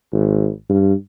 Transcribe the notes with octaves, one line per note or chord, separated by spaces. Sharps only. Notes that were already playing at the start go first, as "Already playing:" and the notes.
G#1
G2